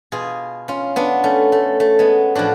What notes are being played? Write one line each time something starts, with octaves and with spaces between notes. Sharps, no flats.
B2 F4 G#4
C#4 F4
B3 D4
A3 C#4
A3
A3
G#3 B3
A2 F3 D4 F#4